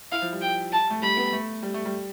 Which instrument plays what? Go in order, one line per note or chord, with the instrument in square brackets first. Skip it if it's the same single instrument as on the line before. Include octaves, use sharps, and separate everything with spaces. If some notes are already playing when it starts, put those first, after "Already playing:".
[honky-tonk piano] E4 [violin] F5
[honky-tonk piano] F3
G3
[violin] G5
A5
[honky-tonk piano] A3
[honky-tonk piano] G3 [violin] B5
[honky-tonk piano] B3
A3
G3
A3
G3